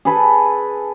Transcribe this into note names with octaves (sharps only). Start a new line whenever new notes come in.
G#4 A4 B4 A5